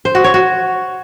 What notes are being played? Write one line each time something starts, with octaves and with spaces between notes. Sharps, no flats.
C5
F#4
C#5
F#4